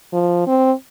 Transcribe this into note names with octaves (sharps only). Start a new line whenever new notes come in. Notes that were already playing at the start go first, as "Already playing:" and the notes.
F3
C4